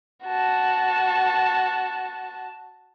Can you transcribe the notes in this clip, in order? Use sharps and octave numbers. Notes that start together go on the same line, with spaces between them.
F#4 A5